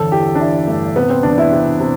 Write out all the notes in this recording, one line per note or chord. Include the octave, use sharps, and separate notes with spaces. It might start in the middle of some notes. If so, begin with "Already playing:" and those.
Already playing: G1 E2 A4
E3 G4
D4
E3 E4
G2 A3
C3 B3
C4
E1 D4
E4
C3
C3